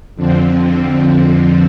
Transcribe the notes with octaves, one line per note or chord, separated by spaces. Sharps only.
F2 D3 F3 C4